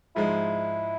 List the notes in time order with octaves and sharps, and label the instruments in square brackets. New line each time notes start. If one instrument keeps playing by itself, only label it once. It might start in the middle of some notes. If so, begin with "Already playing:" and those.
[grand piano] G#2 F3 G#3 [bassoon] E4